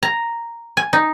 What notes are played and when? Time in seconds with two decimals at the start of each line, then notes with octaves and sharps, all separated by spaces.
0.03 A#5
0.77 G#5
0.93 D#4